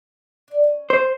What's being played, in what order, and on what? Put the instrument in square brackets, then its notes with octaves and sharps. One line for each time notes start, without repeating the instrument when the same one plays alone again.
[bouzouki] D4 D5
C#4
[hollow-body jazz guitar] C5